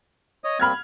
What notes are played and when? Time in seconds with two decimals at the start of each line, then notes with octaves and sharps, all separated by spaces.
0.44 C#5 D#5 D#6
0.60 G3 A#3 C4 B5 F6 G#6